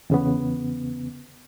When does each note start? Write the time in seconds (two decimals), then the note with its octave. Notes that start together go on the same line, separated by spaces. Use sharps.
0.10 E2 C#3 B3